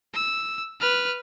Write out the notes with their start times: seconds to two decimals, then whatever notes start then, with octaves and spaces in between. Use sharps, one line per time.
0.14 E6
0.81 B4 F6